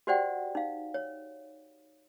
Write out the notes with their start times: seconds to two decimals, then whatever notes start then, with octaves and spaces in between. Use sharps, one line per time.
0.07 F#4 G4 C5 D5 F#5 G5
0.55 D#4 F5
0.94 C#5